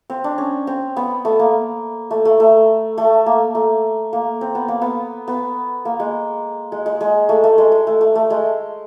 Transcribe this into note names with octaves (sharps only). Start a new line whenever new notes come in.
C4
D4
C#4
C4
B3
A3
A#3
A3
A3
A3
A3
A#3
A3
A#3
C4
B3
A#3
B3
B3
A#3
G#3
G#3
G#3
G#3
A3
A3
G#3
G#3
A3
A3
A3
G#3